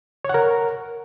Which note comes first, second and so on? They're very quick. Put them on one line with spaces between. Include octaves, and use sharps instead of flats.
C#5 F#5 A#4